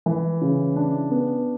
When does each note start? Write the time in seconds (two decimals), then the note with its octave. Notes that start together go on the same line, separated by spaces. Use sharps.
0.06 E3
0.42 C#3
0.76 D4
1.11 B3